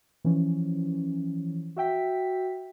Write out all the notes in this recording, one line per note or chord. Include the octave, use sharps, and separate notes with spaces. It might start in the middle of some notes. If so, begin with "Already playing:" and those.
E3 F3 C#4
F#4 E5 G5 B6